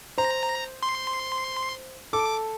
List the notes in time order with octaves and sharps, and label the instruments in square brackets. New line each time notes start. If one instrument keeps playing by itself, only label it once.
[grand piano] C5 [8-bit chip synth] A#5
[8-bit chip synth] C6
[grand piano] A4 [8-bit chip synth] D6